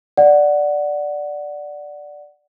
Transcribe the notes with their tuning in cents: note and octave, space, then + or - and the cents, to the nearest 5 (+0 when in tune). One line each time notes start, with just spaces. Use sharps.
D5 +0 F#5 +0